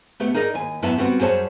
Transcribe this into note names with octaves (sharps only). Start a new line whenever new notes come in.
A3 B3 G4
D#4 G#4 A#4 D5 D#5
D#2 G#5
F#2 B3 E4 E5 A5
G3 B3 C4 F#4 G4
F#2 G3 G#4 C5 C#5 A5